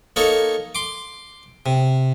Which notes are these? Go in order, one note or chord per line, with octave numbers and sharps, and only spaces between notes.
A#3 D#4 A4 C#5
C6 D6
C3